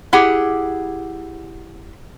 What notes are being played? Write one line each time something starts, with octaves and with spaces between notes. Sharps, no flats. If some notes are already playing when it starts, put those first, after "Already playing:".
E4 G4 G#4 F#5